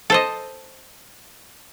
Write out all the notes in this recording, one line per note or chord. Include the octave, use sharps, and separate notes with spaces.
A4 C5 D#5